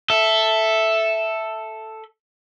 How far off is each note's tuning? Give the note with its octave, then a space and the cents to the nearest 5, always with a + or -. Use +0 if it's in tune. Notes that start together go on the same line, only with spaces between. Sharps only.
A4 +0 E5 +0